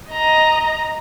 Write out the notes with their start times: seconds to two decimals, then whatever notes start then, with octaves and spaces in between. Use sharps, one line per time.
0.11 D#5 A#5